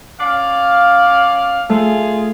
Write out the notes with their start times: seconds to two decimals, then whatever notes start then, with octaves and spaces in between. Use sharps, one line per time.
0.20 C#4 D5 F5
1.70 A3 F4 G#4